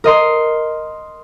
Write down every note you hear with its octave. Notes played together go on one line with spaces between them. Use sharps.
A#4 D#5 C6